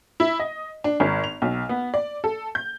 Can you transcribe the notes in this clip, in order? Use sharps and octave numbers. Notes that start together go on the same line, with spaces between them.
E4
D#5
D4
G#1
F7
B1
B3
D5
A4
G6